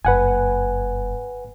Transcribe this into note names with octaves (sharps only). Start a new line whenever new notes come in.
F#1 G2 B4 F#5 G#5